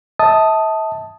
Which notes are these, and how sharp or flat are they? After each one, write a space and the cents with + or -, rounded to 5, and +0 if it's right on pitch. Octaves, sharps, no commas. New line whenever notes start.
E5 -40 A5 +0 D#6 +0